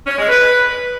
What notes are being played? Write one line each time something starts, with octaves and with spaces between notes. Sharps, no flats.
C#4
G#3
B4